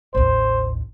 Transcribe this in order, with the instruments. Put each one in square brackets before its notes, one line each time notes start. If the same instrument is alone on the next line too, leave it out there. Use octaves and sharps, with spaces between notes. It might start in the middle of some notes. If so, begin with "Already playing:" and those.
[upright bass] A1 D#2 [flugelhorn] C5